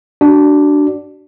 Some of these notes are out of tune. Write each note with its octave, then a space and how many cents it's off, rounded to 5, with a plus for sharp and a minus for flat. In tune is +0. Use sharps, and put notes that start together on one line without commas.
D4 +0 F#4 +30 D5 +0